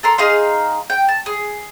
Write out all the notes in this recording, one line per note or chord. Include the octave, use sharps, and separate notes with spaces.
A4 A#4 C6
D#4 G#4 F5 C6
G5
A5
G#4